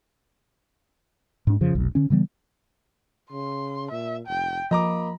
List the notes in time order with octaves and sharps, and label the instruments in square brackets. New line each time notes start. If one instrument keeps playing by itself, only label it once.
[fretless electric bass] G#2 D4
F2 C#3 F3
F1 B1
D3 C#4
C#3 E3 G3 B3
[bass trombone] C#3 [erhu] C6
[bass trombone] A#2 [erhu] E5
[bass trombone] F1 [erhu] G5
[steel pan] F3 [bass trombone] A#3 [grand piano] D#5 A#5 D6 [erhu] B5